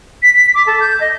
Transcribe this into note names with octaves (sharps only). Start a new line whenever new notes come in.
B6
B6
D6
A4
G6
D#5